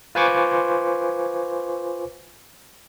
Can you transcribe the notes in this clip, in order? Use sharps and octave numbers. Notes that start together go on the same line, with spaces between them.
F4 B4 C5 G#5 C#6 D6